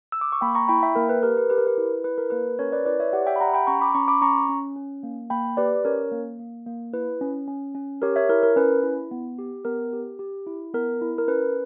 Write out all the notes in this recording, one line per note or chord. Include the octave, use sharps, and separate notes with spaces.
E6
D6
C#6
A#3 G5 B5
A#5 C#6
E4 G5 B5
E5 G5
A#3 A#4
B4
G4 A#4
B4
G4 B4
A#4
B4
E4
E4 B4
A#4
A#3 B4
C#4 A#4 C#5
B4 D5
E4 B4 D5
C#5 E5
G4 D5 F#5
E5 G5
B5
G4 F#5 A#5
G5 B5
C#4 A#5 C#6
B5 D6
C#4 A#5 C#6
B5 D6
C#4 A#5 C#6
C#4
C#4
A#3
A#3 G5 B5
G4 B4 D5
C#4 A#4 C#5
A#3
A#3
A#3
E4 B4
C#4
C#4
C#4
G4 A#4 C#5
C#5 E5
E4 A#4
A#4
C#4 B4
E4
B3
G4
B3 A#4
G4
G4
E4
B3 A#4
E4
A#4
C#4 B4